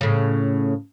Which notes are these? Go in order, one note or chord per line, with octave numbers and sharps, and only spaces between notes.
A2 C#3